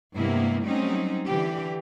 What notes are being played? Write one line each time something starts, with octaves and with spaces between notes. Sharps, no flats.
G2 C3 G#3 A#3 B3 E4
F#3 G3 A3 C4 C#4 D#4
D3 E3 G4